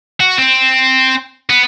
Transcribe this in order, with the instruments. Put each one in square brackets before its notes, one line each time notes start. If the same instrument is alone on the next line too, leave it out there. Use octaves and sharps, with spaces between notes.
[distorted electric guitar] F#4
C4
B3